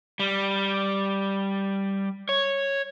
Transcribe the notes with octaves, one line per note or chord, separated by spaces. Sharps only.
G3
C#5